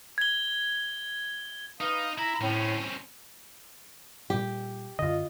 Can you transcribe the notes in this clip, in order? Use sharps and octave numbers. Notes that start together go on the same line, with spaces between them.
G#6 G7
D#4 B4 F5 D#6
E4 A#5
A2 C4 C#4
A#2 G3 G4
F#2 D3 F4 D#5